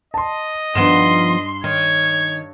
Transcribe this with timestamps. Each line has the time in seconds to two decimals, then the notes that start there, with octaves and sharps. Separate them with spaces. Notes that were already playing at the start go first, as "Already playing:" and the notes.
0.14 D#5 A5 C6
0.75 G2 D#3 F3 B3 C6 E7
1.64 D#3 C#5 G#6